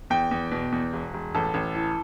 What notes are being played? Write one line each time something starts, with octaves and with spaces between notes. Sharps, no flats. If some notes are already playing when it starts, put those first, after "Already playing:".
E2 G5
E2
B2
E2
E1
E1
A1 A4
A1
E3